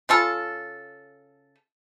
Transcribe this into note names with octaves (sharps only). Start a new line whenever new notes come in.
C#3 F4 A4